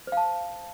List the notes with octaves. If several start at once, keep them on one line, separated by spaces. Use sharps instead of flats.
C5 F5 A5